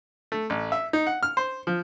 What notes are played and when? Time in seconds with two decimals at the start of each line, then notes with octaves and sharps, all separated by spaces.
0.32 A3
0.50 A1
0.72 E5
0.93 D#4
1.07 F#5
1.23 F6
1.37 C5
1.67 F3